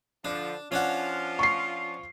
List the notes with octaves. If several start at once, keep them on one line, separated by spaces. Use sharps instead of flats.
D3 F3 D4
F3 C#4 D4 F4 F#5
C#6 C7